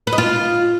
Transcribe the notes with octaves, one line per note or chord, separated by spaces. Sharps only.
B4
D#5
F4